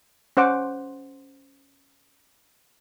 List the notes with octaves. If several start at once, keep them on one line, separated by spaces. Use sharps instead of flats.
C#4 C5 F#5 D6